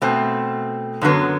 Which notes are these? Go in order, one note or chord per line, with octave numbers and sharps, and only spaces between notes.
B2 A3 C4
F#2 D3 F#3 B3